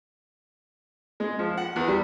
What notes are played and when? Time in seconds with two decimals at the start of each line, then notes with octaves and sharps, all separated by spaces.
1.20 G#3
1.39 F3
1.57 F#5
1.76 E2
1.88 G3